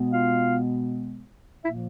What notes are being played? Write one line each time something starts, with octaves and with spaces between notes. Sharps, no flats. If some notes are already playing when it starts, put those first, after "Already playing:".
Already playing: B2 G#3 B3
F4 F5
A#2 F3 A#3 E4 E5